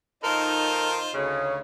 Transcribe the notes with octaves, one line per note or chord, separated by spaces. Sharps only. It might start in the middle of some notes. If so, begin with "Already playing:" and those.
D#3 D#4 F4 A4 A#4 C5
D2 C#3 C#5